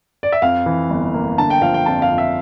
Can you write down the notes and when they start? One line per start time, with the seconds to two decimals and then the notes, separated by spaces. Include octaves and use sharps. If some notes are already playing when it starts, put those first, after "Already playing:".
0.23 D5
0.32 E5
0.42 F2 F5
0.66 E3
0.90 G1
1.14 A#3
1.38 D3 A5
1.50 G5
1.62 F3 F5
1.74 G5
1.86 F2 A5
2.02 F5
2.11 F2
2.18 E5